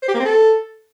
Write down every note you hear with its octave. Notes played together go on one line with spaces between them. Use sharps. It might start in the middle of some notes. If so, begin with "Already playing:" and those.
C5
G4
A#3
C4
A4